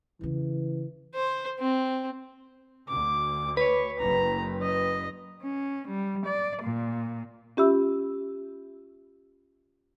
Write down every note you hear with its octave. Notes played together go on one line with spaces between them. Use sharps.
E2 C#3 E3
C5
C4
D2 D6
B4 C#5
F#1 A#5
D#5
C#4
G3
D5
A#2
C#4 F4 G4 E5 B5 E6